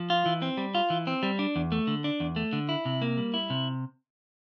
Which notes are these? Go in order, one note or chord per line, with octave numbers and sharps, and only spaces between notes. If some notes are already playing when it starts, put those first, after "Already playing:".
Already playing: F3
F4
E3
C4
G3
F4
E3
C4
G3
D4
E2
A3
D3
D4
E2
A3
D3
E4
C3
A#3
G3
E4
C3